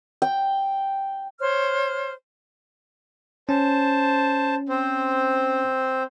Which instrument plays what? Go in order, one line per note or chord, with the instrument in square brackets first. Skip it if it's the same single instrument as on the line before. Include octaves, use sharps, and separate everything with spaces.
[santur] G5
[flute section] C5 C#5 F6
[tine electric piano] C#4 [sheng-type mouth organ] C5 A5
[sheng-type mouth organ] C4 C5